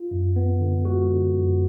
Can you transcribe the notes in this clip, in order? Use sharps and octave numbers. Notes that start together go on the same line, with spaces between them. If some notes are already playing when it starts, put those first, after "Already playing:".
Already playing: F4
F#2
B3
D3
G#3 F#4
D3
F#2